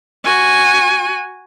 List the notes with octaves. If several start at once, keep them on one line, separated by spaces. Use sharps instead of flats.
F#4 G#5